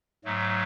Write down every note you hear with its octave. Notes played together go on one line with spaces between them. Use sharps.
G#2 F#3 A3